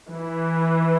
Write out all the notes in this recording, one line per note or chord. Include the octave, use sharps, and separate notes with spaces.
E3